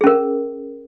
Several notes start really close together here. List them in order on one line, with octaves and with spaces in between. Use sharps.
G#4 C#4 A#4